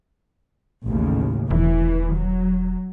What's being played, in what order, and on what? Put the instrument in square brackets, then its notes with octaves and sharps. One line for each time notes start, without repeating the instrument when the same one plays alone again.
[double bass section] A1 D#2 C#3
[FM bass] E1 [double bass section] E3
[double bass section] F#3